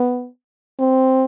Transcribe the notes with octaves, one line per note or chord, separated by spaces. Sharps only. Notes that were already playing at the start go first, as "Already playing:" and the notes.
Already playing: B3
C4